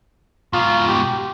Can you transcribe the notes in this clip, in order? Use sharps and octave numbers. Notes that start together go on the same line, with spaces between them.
G#2 B2 F4
G4